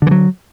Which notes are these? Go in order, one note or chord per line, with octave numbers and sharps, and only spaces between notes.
D3 E3 F#3